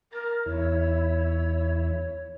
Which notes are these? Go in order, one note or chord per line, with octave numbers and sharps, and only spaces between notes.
A#4 A#5 A6
E2 E4 C#5